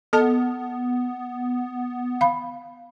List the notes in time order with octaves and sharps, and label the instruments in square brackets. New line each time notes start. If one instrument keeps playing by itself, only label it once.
[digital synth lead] B3 [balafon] A4 D#5 A5
[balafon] F5 B5